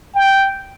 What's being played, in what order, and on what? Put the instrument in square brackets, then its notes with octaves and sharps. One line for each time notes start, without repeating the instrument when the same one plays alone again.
[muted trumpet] G5